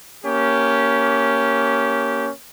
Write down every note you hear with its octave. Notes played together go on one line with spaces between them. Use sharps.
A#3 C#4 G4